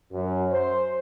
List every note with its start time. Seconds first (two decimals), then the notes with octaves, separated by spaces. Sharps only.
0.13 F#2
0.52 C5